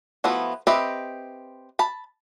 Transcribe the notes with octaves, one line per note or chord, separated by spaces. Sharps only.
F3 A3 B3 E4 F#4
C4 G4 B4 D#5 E5
A5 B5